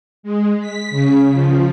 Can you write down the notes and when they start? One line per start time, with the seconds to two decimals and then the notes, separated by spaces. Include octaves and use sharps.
0.23 G#3
0.60 B6
0.90 C#3
1.32 F3